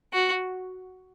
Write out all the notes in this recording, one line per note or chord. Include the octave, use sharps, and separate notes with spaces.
F#4